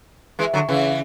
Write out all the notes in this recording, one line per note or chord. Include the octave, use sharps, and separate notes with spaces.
E3 G#3
D3 F#3
C#3 E3